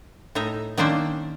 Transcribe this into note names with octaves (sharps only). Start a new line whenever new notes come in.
A2 D#4 E5 A#5
D#3 A#3 C#4 D4 C5 E5